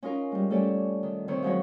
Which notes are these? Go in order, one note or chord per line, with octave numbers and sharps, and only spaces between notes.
C#4 D#4 F4 A#4
G3 G#3
G3 A3 C#4 A4 C#5 D5
D#3
D#3 C4 C#5 E6
F3 F#3 G#3 D#4 E4 C#5